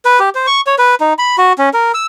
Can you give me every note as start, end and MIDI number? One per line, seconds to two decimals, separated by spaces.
0.05 0.19 71
0.19 0.29 67
0.35 0.46 72
0.47 0.61 85
0.67 0.75 73
0.78 0.95 71
1.00 1.13 63
1.19 1.36 83
1.38 1.53 66
1.58 1.69 61
1.74 1.92 70
1.94 2.06 88